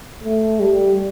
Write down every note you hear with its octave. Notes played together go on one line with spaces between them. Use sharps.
A3
G3